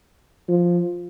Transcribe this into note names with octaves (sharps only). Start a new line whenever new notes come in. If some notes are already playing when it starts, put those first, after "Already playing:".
F3